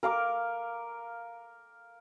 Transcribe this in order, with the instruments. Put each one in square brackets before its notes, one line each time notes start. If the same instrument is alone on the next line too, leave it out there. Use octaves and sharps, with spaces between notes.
[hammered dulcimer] A#4 F5 D6